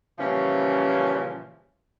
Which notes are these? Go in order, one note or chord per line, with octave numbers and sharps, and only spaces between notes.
A#2 C#3 E3 F3 G3 C#4